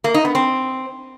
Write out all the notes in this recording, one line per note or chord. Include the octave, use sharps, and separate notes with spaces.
A#3
D#4
B3
C4